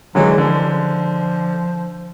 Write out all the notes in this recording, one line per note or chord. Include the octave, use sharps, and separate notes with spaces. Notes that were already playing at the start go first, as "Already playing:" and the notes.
D3 E3 F#3 G#3
D3 F3